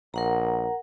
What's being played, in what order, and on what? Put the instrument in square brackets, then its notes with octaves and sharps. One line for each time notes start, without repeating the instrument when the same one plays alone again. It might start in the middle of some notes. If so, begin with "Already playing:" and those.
[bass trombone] A#1 [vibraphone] A#4 F#5 A#5